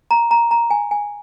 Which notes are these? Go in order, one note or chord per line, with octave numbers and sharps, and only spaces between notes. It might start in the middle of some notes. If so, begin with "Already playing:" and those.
A#5
A#5
A#5
G#5
G#5